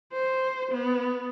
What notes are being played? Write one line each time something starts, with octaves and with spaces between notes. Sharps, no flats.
C5
B3